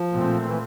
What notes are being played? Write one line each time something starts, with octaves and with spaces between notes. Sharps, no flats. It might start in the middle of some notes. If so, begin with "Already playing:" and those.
Already playing: F3
A#2 A3 C4
E3